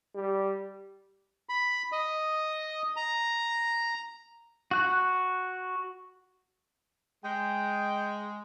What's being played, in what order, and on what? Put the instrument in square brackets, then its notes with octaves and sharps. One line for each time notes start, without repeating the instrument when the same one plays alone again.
[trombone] G3
[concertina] B5
D#5
A#5
[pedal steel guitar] F#4 F#6
[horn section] G#3 [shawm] G5